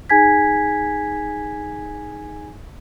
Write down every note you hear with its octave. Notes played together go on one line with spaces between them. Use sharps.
D#4 G#4 G#5 G#6 B6